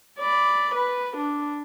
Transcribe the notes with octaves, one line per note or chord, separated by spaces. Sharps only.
D5 B5
B4
D4